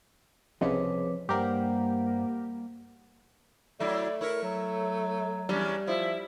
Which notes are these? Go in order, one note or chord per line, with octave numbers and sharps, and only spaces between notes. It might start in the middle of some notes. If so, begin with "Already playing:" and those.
C2 C#3 F3 C4 B4 C#5 D#5 D6
G2 G3 A#3 G4 A#4 C5 F#5 A#5
F#3 A3 E4 D5
E4 A#4 C#5
F#3
E2 G3 C#4 D4
F3 E4 E5